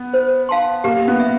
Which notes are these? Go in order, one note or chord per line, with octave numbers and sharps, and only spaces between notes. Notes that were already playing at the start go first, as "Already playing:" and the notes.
Already playing: B3
C5
F5 A5 C6
A#3 G4
B3
E5